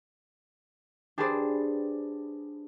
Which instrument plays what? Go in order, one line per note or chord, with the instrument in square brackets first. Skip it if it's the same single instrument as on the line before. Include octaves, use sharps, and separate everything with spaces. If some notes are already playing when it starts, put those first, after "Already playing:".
[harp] D4 G4 G#4 B4 C5 D5